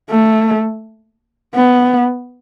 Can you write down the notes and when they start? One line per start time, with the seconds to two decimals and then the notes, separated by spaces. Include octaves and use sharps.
0.10 A3
1.55 B3